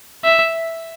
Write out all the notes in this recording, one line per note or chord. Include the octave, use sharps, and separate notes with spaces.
E5